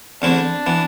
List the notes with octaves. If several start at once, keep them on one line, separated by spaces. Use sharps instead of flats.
E2 D3 A3 C4 D4 E4
E3 B3